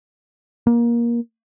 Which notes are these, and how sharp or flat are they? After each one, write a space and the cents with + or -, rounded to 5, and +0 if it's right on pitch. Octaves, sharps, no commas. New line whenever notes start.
A#3 +20